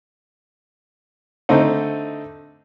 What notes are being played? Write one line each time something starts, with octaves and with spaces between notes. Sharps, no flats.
D3 A3 C4 D#4